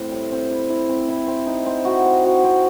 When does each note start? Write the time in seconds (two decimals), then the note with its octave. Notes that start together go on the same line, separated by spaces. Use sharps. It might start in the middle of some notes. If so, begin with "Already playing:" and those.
Already playing: A2 C4 E4
0.11 G3
0.32 C4
0.50 E4
0.70 E4
0.89 C4
1.08 E4
1.27 C4
1.47 D#4
1.66 C4
1.85 F#4
2.05 C4
2.25 F#4
2.44 C4